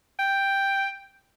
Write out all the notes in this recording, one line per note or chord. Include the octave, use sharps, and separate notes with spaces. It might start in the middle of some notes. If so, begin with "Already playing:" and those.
G5